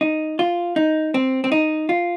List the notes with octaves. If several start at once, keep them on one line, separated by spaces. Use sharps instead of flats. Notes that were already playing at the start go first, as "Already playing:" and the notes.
D#4
F4
D#4
C4
C4
D#4
F4